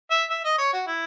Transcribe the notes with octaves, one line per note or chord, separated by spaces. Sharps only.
E5
E5
D#5
C#5
F#4
E4